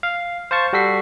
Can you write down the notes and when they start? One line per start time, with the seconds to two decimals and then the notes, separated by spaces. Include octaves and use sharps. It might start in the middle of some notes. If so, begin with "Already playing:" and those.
0.03 F5
0.51 C5 F5 A5 C#6
0.73 G3 F#4 A4 B6 C7